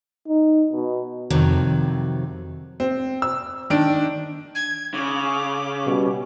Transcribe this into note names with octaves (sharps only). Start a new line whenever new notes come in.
D#4
B2
F2 C3 D#3 F#3
C4
E6
D#3 D4 D7
G#6
C#3 D6
B2 G3 C#4